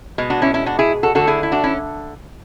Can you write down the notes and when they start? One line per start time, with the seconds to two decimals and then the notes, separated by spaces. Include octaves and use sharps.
0.18 B2 G#3
0.30 D4 F#4
0.42 C#4 E4
0.54 C#4 E4
0.66 D4 F#4
0.79 E4 G#4
1.03 F#4 A4
1.15 D3 A3 F#4 A4
1.27 E4 G#4
1.43 E4
1.51 D4 F#4
1.64 C#4 E4